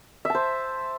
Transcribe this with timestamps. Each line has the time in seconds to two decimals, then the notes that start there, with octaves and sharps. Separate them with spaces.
0.25 E5
0.30 A5
0.35 C5